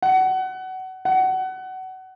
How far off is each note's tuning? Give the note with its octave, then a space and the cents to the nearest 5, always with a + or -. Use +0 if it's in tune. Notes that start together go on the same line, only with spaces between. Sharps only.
F#5 +25
F#5 +25